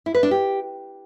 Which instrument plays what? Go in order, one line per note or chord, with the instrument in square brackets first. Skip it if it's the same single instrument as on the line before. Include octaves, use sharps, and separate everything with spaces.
[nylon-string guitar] E4
B4
D4
G4